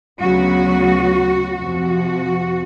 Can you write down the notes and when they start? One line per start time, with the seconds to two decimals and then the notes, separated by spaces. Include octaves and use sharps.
0.19 D2 C#3 F#3 B3 F#4
1.54 F2 C3 F3 F#4